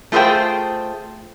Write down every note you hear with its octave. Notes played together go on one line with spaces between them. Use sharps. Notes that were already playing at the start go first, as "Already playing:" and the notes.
A3 F4 G#4 A#4 C5 G5